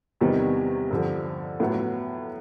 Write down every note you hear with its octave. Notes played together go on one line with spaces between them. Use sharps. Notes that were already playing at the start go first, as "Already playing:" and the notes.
E2 C3 D#3 G3 B3
G2 D3 F3
A2 F#3 B3